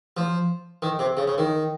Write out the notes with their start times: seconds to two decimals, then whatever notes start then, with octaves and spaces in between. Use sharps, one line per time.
0.17 F3
0.82 D#3
0.99 C3
1.17 C#3
1.28 C#3
1.38 D#3